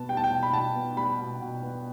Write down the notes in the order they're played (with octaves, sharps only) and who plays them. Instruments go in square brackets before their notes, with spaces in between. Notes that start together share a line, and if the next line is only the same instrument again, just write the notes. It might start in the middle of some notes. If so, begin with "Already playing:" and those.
Already playing: [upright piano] B2 B3 A5
G3 G5
A5
G5
B2
B5
B2 A5
B3
G3 B5
B2
B2
B3